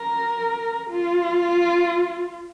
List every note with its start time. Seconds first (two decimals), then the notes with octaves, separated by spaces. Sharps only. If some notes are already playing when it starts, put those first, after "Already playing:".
Already playing: A#4
0.90 F4